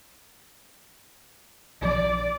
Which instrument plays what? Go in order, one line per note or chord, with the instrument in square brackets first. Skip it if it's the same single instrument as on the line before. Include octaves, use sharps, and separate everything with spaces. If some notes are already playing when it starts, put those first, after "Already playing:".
[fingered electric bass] A#1 F3 [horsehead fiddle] D5